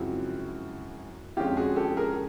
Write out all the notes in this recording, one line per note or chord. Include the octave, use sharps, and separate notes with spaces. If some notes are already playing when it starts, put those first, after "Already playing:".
Already playing: F#2 C#3 F3 G#3 C4 E4 F#4
F2 D3 F3 G#3 C#4 F4 G4
F#4 G#4
G4 A4
G#4 A#4